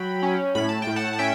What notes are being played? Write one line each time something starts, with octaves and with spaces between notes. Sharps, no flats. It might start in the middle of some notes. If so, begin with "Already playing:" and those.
Already playing: F#3 G5 B5
C#4
A2 B5
A5
G5
A2
F#5 A5
A5
C#4 E5 G5